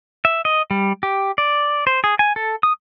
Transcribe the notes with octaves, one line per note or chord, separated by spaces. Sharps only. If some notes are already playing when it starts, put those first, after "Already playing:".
E5
D#5
G3
G4
D5
C5
G#4
G#5
A4
D#6